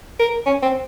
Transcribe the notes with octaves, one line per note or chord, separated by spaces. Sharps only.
A#4
C#4
C4